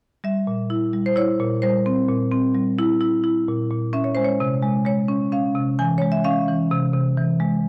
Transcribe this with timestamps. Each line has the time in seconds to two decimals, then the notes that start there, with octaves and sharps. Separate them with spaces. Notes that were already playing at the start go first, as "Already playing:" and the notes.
0.24 G3 E5
0.47 A#2
0.70 E4
0.93 G3
1.06 C5
1.16 E4 C#5
1.40 A#2
1.62 G3 C5
1.86 C4
2.09 A#2
2.32 C4
2.54 G3
2.79 E4
3.01 E4
3.24 E4
3.48 A#2
3.71 A#2
3.93 C#4 E5
4.04 C#5
4.15 G#3 C5
4.24 C#5
4.40 C3
4.62 G#3
4.85 G#3 C#5
5.08 C#4
5.32 C#4 F5
5.55 C3
5.79 E3 G#5
5.98 G#3 C#5
6.12 E5
6.24 C#4 F5
6.48 E3
6.71 C3
6.93 C3
7.17 E3
7.40 G#3